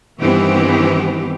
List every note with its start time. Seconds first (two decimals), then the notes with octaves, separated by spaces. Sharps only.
0.21 G2 D#3 E3 B3 C4 G4